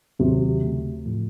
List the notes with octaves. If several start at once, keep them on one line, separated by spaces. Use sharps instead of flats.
D#2 C3 D#3 F#3 C4 F#4
D#2 C#3 A3
A2 F3 A3